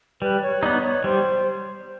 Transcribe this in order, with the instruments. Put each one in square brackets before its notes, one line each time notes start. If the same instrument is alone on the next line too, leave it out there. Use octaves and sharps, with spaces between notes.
[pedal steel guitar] G3 [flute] B4
[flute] C#5
[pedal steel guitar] B3 D#4 [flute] D5
[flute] C#5
[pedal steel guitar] G3 [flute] C5